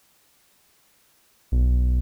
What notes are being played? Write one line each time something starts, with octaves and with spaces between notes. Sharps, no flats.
B1